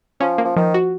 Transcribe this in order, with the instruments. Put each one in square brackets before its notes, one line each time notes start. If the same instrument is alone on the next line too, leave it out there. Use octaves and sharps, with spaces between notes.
[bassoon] F3 [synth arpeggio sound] C#4
[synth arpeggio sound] A#3
[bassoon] F3
[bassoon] D#3 [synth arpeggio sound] F3
[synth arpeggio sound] F#4